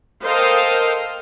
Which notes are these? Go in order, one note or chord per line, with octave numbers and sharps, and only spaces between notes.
A4 A#4 C5 D#5 F5 G5